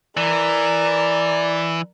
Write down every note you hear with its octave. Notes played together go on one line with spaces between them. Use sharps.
E3 A#4 D5